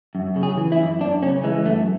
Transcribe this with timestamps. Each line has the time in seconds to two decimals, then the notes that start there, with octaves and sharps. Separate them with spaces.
0.15 F#2
0.36 C#3
0.43 G#4
0.57 E3
0.72 E4
0.78 F#2
1.01 F#2 D4
1.23 C#3 C#4
1.44 E3 G#3
1.65 F#2 A3